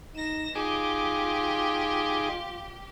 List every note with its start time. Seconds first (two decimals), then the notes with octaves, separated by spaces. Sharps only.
0.15 D#4 A#6 E7
0.55 D#4 F4 G4 G#4 D6